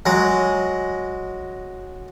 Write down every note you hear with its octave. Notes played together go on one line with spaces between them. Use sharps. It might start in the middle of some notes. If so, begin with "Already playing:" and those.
F#3 G#3